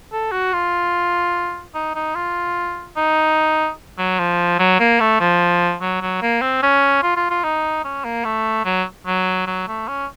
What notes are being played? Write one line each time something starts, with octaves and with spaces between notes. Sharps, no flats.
A4
F#4
F4
D#4
D#4
F4
D#4
F#3
F3
F#3
A#3
A3
F3
F#3
F#3
A#3
C4
C#4
F4
F4
F4
D#4
C#4
A#3
A3
F#3
F#3
F#3
A3
C#4